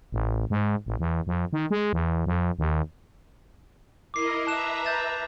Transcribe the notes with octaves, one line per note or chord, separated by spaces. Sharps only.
A1
G#2
A1
E2
F2
D#3
G#3
E2
F2
D#2
E4 A#4 D#5 D6 C7
B4 E5 A5 A#5 F#6 E7
G6 A6 E7